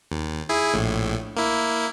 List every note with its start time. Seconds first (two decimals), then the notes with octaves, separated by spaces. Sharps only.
0.12 D#2
0.49 E4 G#4
0.74 A#1 A2
1.37 A#3 E4